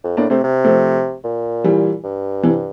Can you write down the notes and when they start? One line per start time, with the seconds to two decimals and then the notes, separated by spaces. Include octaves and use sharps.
0.04 F2
0.17 A2 A#3 D4
0.30 C3 A3 C4
0.44 C3
0.64 F3 A3
1.24 A#2
1.64 E3 G3
2.04 G2
2.43 C3 E3